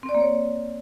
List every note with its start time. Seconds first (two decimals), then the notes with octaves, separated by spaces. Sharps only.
0.03 C4
0.09 D5
0.15 A#3
0.20 C#5